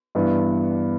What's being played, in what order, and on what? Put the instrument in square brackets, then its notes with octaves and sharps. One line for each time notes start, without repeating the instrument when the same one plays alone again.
[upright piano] G2 E3 B3 D4